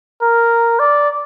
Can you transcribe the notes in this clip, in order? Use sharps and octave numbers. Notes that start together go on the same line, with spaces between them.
A#4
D5